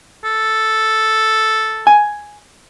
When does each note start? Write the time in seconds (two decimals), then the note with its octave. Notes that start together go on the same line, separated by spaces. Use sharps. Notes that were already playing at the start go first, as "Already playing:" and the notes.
0.24 A4
1.87 G#5